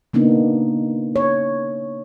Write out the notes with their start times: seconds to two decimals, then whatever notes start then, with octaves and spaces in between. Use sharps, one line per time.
0.14 C#3 A#3 B3 D4 D#4
1.16 C#5